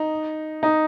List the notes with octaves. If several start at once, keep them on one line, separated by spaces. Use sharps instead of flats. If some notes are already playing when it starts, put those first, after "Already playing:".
Already playing: D#4
D#4